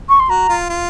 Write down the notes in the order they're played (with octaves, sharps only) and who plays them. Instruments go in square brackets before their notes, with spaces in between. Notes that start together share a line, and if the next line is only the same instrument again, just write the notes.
[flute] C#6
C6
[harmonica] F#4 [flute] A#5
[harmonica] F4
F4